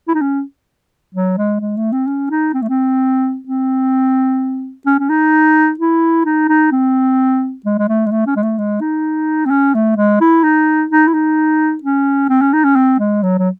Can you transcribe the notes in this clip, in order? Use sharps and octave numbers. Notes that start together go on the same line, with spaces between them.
E4
D#4
C#4
F#3
G#3
G#3
A3
C4
C#4
D#4
C4
A3
C4
C4
C#4
C#4
D#4
E4
D#4
D#4
C4
G#3
G#3
A3
G#3
A3
C#4
G#3
A3
G#3
D#4
C4
C#4
A3
G#3
E4
D#4
D#4
E4
D#4
C#4
C4
C#4
D#4
C#4
C4
G#3
F#3
F#3